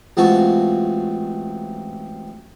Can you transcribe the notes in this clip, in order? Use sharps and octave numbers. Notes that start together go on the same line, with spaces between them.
A1 G#3 C4 F4 F#4 A5